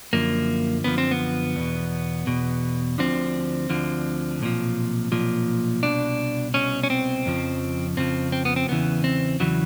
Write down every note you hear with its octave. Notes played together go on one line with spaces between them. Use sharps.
F#2 D3 F3 A#3
F#2 D3 F3 B3
C4
B3
E2 B2
E2 B2
D2 D3 F3 C4
D2 D3 F3
B1 A#2 F3
B1 A#2 F3
C2 B2 D4
C2 B2 C#4
C#4
C4
F2 C#3 F3
F2 C#3 F3 C4
C4
B3
C4
E2 C#3 E3 B3
C4
E2 C#3 E3 F#3